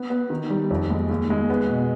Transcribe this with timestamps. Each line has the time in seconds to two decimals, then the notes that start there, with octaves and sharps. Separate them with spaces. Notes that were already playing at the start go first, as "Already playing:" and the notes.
Already playing: B3
0.10 B3
0.30 D#3
0.50 G3
0.71 F2
0.90 G#3
1.10 D#2
1.30 G#3
1.50 B3
1.69 B2